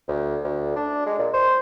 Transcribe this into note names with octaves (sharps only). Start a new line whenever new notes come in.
D2
D2
D4
G#3
A#2
C5